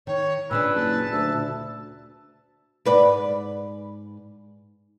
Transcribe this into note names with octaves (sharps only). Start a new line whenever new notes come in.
D#3 C#5
A#2 C#3 D4 B4 E6
F#1 A5
D2 E5
G#2 B4 D5